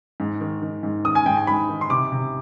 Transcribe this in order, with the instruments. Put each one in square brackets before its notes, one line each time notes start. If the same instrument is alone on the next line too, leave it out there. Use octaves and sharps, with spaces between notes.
[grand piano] G#2
D#3
D#3
G#2
D#3 D#6
G#5
G#2 G5
G#5
G#2 B5
D#3
C6
C3 D6
C3